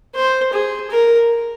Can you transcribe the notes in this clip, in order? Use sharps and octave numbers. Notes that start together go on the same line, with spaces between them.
C5
G#4
A#4